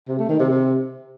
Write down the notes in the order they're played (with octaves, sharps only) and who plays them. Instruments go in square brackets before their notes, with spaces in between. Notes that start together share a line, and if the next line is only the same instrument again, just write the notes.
[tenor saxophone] C3
A3
D#3
C3
C3